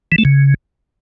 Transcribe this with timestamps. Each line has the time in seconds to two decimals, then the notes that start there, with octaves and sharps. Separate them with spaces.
0.12 E3
0.18 A3
0.25 C#3